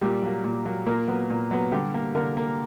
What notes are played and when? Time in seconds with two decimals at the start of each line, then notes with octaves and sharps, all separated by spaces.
0.01 A#2 G3 G4
0.22 F#3 A#3
0.44 A#2
0.65 F#3 A#3
0.86 A#2 A#3 A#4
1.08 F#3 B3
1.30 A#2
1.51 F#3 B3
1.72 D3 G3 G4
1.94 A#3
2.15 D3 A#3 A#4
2.37 A#3